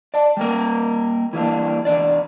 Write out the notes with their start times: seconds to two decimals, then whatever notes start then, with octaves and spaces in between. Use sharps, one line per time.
0.14 D5 A5
0.37 G3 A#3 A#4
1.33 E3 G3 A#3 D4
1.85 E2 C#3 D4 D5